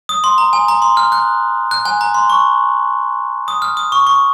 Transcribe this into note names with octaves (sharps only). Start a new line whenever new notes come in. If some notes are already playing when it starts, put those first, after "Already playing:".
D#6
C6
A#5
G#5
A#5
C6
F6
F#6
F#6
G#5
A#5
C6
C#6
D#6
F6
D#6
C#6
C#6